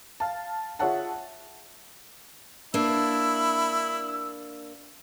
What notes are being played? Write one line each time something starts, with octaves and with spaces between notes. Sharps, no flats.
F5 A5
F4 G#4 C#5 E5 F#5 A5
A#3 D4 E4 E6